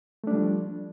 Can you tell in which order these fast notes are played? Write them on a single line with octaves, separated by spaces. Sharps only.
A3 D4 G3 F3